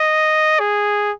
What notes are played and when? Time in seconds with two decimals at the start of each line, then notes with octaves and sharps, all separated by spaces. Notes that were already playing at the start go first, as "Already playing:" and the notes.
Already playing: D#5
0.60 G#4